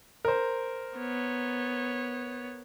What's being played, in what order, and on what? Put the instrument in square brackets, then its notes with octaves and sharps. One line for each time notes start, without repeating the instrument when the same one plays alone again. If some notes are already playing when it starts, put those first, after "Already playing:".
[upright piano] A#4 C5
[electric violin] B3 C#5